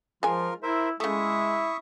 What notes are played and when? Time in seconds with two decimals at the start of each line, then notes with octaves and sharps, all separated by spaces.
0.23 F3 G#3 F4 A#4 G#5 F6
0.63 E4 A#4 C5 E5
1.00 C#3 G#3 A3 E4 E5 C#6 D#6